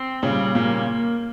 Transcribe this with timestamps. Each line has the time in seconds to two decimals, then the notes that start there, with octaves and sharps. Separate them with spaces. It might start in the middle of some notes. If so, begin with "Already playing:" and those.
Already playing: C4
0.23 A#2 C#3 G3
0.55 A#2 C#3 A#3